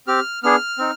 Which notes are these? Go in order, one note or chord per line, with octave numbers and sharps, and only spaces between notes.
C4 G4 F6
B3 D4 G#4 F6
C4 D#4